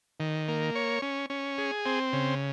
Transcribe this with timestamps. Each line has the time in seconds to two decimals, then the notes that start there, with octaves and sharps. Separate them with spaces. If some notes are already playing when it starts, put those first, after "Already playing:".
0.20 D#3
0.48 A#3
0.75 C#5
1.02 C#4
1.30 C#4
1.58 G#4
1.86 C4
2.13 C#3